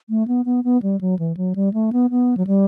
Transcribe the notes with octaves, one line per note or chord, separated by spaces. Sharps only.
A3
B3
B3
B3
G3
F#3
E3
F#3
G3
A3
B3
B3
F#3
G3